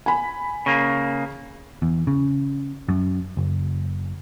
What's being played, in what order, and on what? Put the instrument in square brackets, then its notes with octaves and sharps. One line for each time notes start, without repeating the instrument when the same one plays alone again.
[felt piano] G#5 B5
[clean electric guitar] C#3 A#3
[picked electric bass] E2
C#3
F#2
F#1